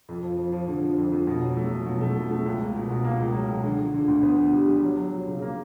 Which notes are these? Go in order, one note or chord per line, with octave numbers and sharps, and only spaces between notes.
F2
F3
F3
F3
D3
F3
F2
F2
B2
F#3
A3
F#3
B2
A3
B2
A3
C#2
A#3
B2
B2
A#3
C#2
F#3
C#2
D3
D3
D3
D2
B3
D3
G3
G3
F#3
F#3
F#3
C#3
A#3